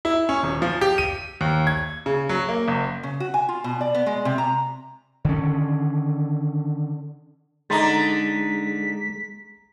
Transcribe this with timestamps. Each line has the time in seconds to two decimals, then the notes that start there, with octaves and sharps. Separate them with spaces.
0.05 E4
0.29 C#4
0.43 D#1
0.62 F3
0.81 G4
0.98 D#7
1.41 D#2
1.67 G#6
2.06 C#3
2.29 F#3
2.49 A#3
2.68 F#1
3.03 C#3
3.20 F#4
3.34 G#5
3.49 F4
3.64 B2
3.81 D5
3.95 B3
4.06 G#3
4.25 C3
4.38 A#5
5.25 D3 D#3 C#4
7.70 D3 G#3 D#4 A#5 C6 A6 B6